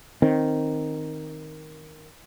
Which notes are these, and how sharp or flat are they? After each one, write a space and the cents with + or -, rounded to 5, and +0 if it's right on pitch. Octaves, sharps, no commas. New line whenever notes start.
D#3 +0 C4 +10